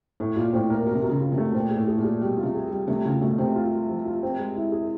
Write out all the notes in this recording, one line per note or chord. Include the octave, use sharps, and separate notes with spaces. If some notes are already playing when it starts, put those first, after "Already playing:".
A2 A3
A#2 F4
A2 C4
A#2 A#4
B2 A#4
C3
B2 A#4
C#3
F4
C3
A3
B2
A#2 C4
G#4
A2
G#4
A#2
G#4
B2 G3
F4
C3
G#4
G3
C3 A3
C#3 F4
B2 A3
C3 C4
F4
F4
F3
F4
C4
G#3
E4
G#4